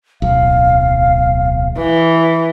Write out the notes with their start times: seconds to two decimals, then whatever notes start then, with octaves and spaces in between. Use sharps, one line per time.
0.22 D1 B1 F5
1.78 E3